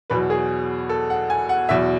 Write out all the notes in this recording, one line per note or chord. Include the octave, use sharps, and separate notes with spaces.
E2 B2 F#3 B4
G#4
A4
F#5
G#5
F#5
E2 B2 F#3 E5